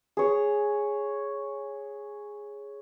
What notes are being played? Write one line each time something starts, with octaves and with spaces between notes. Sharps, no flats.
G#4 C#5